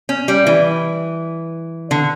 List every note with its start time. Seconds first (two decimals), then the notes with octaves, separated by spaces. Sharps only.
0.09 C#4
0.28 G3
0.46 E3
1.91 D3